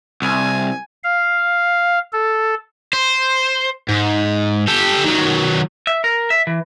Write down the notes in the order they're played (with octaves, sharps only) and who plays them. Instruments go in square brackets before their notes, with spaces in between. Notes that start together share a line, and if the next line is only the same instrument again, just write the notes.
[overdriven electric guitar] C2 [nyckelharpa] G#5
[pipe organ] F5
A4
[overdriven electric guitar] C5
G#2
G4 A4
D#3 F#3
[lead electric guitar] E5
A#4
E5
E3